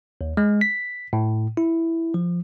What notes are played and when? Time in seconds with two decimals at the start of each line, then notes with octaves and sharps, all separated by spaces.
0.21 D#2
0.37 G#3
0.61 B6
1.13 A2
1.57 E4
2.14 F3